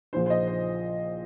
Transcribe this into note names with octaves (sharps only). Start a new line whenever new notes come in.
A#1 A#2 F3 C5
C5
D#5
C5